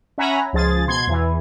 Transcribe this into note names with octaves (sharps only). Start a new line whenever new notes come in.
C#4 E5 F#5 G#5 A#5 B5
C#2 F3 G#4 A6
B2 C6 G#6
E2 E3